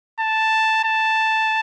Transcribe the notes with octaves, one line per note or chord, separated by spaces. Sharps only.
A5
A5